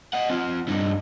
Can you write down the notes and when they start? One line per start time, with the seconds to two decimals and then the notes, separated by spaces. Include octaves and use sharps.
0.14 D#5 F#5
0.30 C4 F4
0.68 G2 D#4